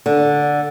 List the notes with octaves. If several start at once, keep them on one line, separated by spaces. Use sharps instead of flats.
D3